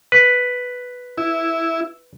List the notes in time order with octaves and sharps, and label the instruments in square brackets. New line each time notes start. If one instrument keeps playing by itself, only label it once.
[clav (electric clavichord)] B4
[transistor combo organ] E4